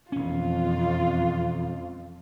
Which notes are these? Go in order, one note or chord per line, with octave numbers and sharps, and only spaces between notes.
E1 F2 C#4 F4